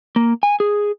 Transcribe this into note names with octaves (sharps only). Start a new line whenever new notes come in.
A#3
G#5
G#4